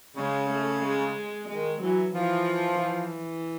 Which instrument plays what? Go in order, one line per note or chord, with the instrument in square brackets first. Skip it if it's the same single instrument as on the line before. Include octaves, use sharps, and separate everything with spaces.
[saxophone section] C#3 [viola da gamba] G#3
[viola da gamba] A3
G#3
[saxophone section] D#3 [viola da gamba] G#3
[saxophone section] E3 [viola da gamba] F#3
[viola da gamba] E3 [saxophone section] F3
[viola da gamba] E3